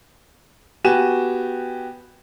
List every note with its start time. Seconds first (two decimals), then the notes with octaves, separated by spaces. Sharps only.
0.84 B3 F#4 G4 G#5 E7